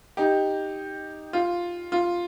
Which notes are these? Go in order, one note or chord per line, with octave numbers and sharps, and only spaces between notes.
D#4 G4
F4
F4